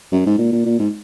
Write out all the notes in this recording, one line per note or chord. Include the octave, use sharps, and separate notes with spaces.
F#2
G#2
A#2
A#2
A#2
G#2